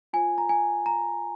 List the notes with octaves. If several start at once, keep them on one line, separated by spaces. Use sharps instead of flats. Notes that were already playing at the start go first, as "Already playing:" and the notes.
F4 C5 G#5
A#5
G#5
A#5